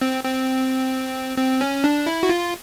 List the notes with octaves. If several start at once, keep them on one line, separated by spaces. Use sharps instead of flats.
C4
C4
C4
C#4
D4
E4
F#4
F4